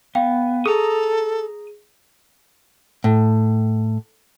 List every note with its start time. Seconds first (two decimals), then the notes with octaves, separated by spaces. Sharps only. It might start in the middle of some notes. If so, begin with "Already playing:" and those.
0.15 B3 F5 G5
0.66 G#4 A4 A#5 D#6
3.04 A2